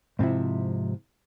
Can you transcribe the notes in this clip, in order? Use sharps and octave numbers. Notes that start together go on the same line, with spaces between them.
G#2 C3 F3 E4